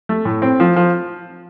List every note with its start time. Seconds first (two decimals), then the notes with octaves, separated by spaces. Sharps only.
0.09 A3
0.25 A2
0.42 C4
0.60 F3
0.76 F3